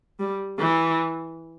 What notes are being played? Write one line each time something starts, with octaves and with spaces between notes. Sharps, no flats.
G3
E3